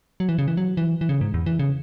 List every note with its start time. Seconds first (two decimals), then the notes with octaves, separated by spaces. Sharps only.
0.20 F#3
0.29 E3
0.38 C#3
0.48 E3
0.57 F#3
0.77 E3
1.01 E3
1.09 C#3
1.21 G#2
1.34 E2
1.46 E3
1.59 C#3